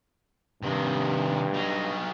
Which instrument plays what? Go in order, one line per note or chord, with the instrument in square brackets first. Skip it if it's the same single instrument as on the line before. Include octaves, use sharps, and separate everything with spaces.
[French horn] G2 [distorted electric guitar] C3 D#3
[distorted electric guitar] F#3 D#4